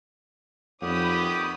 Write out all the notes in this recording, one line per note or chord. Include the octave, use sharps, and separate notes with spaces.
F2 D#3 G4 C#5 F#5 B5 D#6